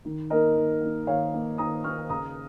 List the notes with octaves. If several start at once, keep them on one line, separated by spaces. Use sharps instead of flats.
D#3
A#3 D#4 A#4 D#5
D#3
A#3 D#4
D#3 C#5 F5
A#3 D#4
D#3 A#5 D#6
A#3 D#4 C#6 F6
C#3 A#5 D#6